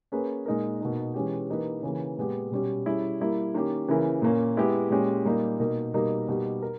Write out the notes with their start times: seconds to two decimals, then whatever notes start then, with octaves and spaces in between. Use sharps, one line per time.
0.12 A#3 C#4 G#4 B4
0.46 A#2 G#3 D#4 A#4
0.80 B2 A#3 D#4
1.14 E3 G#3 C#4 G4
1.49 E3 A#3 D#4 G4 B4
1.83 C#3 E3 A#3
2.18 A#2 G#3 B3 G4
2.51 B2 G3 C#4 G4
2.86 G3 C#4 E4 G#4
3.21 G3 A#3 E4
3.54 D#3 A#3 C#4 G4
3.88 C#3 E3 A#3 E4 A#4
4.22 A#2 A#3 C#4
4.57 G#3 B3 E4 G4
4.90 A#2 G#3 C#4 G4
5.25 A#2 G3 A#3 D#4
5.59 B2 A#3 D#4 A#4
5.94 B2 G3 A#3 D#4 A#4
6.28 B2 G3 A#3 D#4 G4
6.62 A#4